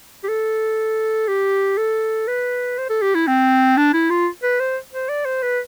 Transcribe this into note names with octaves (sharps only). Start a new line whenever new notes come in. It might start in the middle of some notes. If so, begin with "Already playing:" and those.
G4
A4
G4
A4
B4
C5
A4
G4
E4
C4
D4
E4
F4
B4
C5
C5
D5
C5
B4